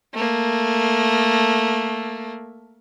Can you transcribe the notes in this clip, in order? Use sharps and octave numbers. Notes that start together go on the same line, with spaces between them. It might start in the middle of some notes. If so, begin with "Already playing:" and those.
A3 A#3